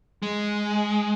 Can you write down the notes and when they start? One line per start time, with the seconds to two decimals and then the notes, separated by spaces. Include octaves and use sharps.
0.23 G#3